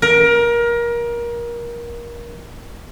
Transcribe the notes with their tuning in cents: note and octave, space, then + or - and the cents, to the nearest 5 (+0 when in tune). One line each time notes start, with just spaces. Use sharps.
A#4 +25